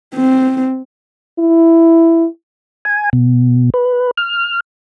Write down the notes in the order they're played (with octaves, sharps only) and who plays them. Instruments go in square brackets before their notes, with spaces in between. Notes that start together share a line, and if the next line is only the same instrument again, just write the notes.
[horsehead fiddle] C4
[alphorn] E4
[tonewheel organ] G#5
B2
B4
F6